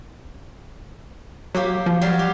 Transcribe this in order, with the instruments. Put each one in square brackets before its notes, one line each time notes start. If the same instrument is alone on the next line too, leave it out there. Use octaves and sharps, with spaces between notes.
[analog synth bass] F#3 [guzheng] A#3 G4 E5
[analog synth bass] F3
[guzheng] F#3 G3 F5
G4